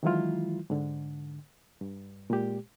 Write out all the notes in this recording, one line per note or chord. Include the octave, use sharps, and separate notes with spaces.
D#3 E3 F#3 G#3 E4 F4
G#2 D3
G2
A#2 G#3 G4